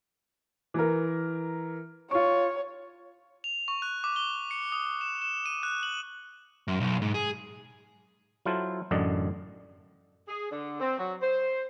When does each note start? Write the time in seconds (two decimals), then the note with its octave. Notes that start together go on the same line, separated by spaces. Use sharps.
0.74 E3 A#4
2.11 F4 C#5 C#6
3.44 F7
3.68 C#6
3.82 F#6
4.04 D6
4.16 G7
4.51 C#7
4.72 D#6
5.01 E7
5.22 E7
5.46 D#7
5.63 F#6
5.83 F#7
6.68 F#2
6.80 B1
7.02 G#2
7.14 G#4
8.46 F#3 E4 F4 A4 C5
8.91 A1 F#2 D3 D5 D#5
10.28 G#4
10.50 D3
10.80 C4
10.98 F#3
11.21 C5